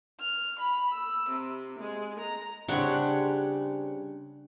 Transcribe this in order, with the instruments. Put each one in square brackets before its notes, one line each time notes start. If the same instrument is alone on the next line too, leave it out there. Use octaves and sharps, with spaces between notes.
[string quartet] F6
B5
E6
C3
G#3
A#5
[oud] C#3 G3 C4 [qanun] D4 C#5 F#5